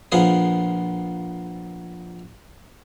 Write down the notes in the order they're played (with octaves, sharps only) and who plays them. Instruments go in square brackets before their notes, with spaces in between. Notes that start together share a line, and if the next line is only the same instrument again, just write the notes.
[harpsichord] A#1 F3 B3 F4 G#4 D#6